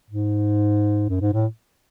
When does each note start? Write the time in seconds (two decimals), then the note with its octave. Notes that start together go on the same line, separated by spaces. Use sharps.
0.10 G#2
1.09 F#2
1.21 G#2
1.33 A2